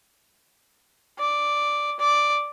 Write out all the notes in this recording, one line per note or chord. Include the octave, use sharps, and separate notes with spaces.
D5
D5